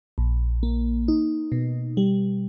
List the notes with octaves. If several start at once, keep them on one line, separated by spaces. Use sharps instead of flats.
A#1
A#3
D#4
B2
G3